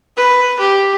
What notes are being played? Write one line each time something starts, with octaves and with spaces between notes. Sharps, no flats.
B4
G4